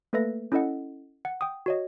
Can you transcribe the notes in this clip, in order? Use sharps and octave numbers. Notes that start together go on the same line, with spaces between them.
A3 A#3 A4 B4 E5 A#6
C#4 E4 A4 D#5 F#5
F#5
G5 D#6
F#4 C#5 D#5